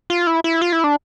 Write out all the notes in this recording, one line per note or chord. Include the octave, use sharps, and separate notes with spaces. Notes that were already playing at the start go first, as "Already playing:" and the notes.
F4
E4
E4
F4
E4
D4